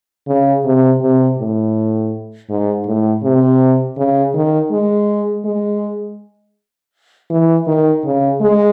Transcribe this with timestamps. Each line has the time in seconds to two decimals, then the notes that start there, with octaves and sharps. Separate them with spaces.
0.28 C#3
0.65 C3
1.01 C3
1.38 A2
2.50 G#2
2.86 A2
3.23 C3
3.98 C#3
4.34 D#3
4.71 G#3
5.45 G#3
7.30 E3
7.67 D#3
8.04 C#3
8.41 G#3